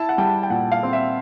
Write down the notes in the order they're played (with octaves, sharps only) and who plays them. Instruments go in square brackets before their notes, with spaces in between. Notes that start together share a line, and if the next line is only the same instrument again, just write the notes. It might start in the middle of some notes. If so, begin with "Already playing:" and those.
Already playing: [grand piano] E4 A5
F#5
G3 G5
G5
A#2 F#5
F5
C4
E5